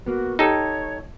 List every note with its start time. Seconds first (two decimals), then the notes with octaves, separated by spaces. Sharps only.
0.06 A#3 B3 F#4
0.39 D#4 G4 A4 C#5